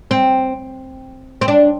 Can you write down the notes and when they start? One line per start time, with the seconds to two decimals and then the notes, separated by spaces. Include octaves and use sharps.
0.11 C4
1.41 C4
1.48 D4